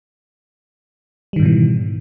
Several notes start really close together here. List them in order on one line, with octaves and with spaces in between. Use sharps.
G3 D#3 G#2 B2 E3